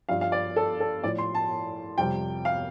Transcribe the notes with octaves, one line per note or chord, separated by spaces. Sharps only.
G2 F3 F5
F5
D5
A4
A4
A2 F3 D5
C6
A5
F2 C3 G3 G5
F5